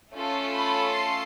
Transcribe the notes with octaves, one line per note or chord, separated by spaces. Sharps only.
A3 C#4 F4 A4
B5
C6